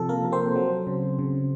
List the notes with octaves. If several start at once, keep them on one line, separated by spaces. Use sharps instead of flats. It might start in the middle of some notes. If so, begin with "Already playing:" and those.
Already playing: C3 F3 A4
A#3 A#4
C3
C4 C5
F#3
C#3
C#3